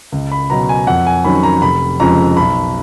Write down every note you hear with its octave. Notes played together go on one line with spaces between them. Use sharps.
C#2
B5
B2 F#3 A#5
G#5
F2 F#5
G#5
D#3 F#3 C#4 B5
A#5
F1 B5
F2 C#3 F3 G#3 A#5
B1 B5